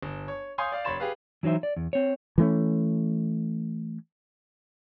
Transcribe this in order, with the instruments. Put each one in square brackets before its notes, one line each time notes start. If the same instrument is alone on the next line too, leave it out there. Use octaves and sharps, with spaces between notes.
[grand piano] G1
C#5
C#5 F5 G#5 C6 D#6 G6
D5 F5
F1 C#5 B5 C6 A6 E7
G4 G#4 B4 F5
[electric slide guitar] E3 F#3 D#4 C5 E5
D5
E2
C4 C#5
[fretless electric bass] E3 A3 C#4